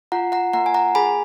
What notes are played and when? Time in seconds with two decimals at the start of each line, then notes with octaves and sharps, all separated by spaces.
0.12 F4 F#5 A#5
0.32 F#5 A#5
0.53 A#3 F#5 A#5
0.66 G#5
0.74 F#5 A#5
0.95 G#4 G#5 B5